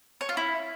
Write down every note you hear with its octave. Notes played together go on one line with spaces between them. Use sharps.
C#5
F4
E4